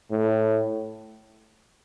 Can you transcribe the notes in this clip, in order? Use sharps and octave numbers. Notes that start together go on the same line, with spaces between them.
A2